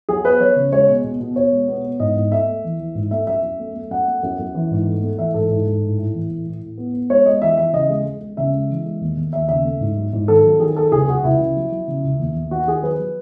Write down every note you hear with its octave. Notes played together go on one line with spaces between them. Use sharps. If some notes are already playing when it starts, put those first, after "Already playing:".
F#3 G#4
B3 B4
F#3 C#5
C#3
G#3 C#5
B2
B2
B2
B2 C#5
G#3
B3
B3
G#2 D#5
G#2
A3 E5
A3
E3
E3
G#2
A3 E5
F#2 E5
F#2
A3
A3
F#2 F#5
A3
F#2
F#2
E3
G#2
A3
A3
E3 E5
G#2 A4
G#2
G#2
A2
A2
E3
A2
A2
A2
B3
B3
G#3 C#5
G#3 D#5
E3 E5
E3 E5
C#3 D#5
G#3
G#3
G#3
C#3 E5
G#3
E3
G#3
D#2
D#2
D#2 E5
C#3 E5
A3
G#2
F#3
G#2
D#3 A4
F#3
D#3 G#4
F#3 A4
C#2 G#4
C#2 F#4
C#2 E4
C#3
F#3
F#3
C#3
C#2
D#2
D#2
D#3 F#4
D#3 G#4
F#3 B4
F#3